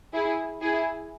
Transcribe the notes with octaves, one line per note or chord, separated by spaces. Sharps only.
E4 G#4
E4 G#4